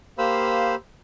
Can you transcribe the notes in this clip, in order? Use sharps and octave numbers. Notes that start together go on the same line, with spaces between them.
A#3 G4 C5 F5 B5 E6